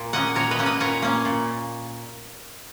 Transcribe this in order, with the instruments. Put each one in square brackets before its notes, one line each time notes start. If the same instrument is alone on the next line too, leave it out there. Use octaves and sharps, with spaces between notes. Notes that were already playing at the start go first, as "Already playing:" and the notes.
Already playing: [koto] A#2
A#3 C#4 D#5 F#5
A#2 A#4 C#5
B4 D#5
A#3 C#4
B4 D#5
A#2 A#4 C#5
A#3 C#4
A#2